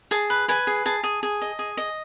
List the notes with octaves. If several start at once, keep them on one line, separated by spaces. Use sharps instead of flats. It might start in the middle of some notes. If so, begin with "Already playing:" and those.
G#4 A5
B4
B4 G#5
G#4
G#4 A5
G#4
G#4
D#5
G#4
D#5